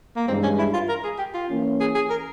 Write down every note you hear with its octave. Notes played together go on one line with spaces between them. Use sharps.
A#3
G2 E3 G#3 C4
C#4
E4
F4
A#4
G#4
G4
F4
E3 A#3 C#4
G#4
G#4
A#4